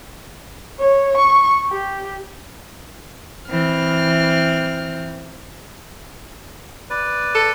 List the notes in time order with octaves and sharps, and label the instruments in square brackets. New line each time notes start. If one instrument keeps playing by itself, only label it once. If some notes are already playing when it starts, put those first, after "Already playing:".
[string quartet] C#5
C#6
G4
E3 C4 F6
[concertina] B4 D5
[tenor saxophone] A4